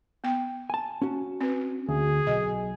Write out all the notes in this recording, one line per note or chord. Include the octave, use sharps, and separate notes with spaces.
B3 G5
G#5 A5
C#4 F#4
C4 B4
D2 G#4
B1 D#5